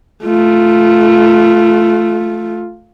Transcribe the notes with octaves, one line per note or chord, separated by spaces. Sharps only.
A3 F4